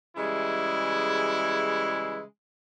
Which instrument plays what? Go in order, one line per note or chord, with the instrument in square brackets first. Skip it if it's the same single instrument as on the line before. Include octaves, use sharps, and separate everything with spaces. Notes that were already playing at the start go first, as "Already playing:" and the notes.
[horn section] C#3 E3 G3 G#3 E4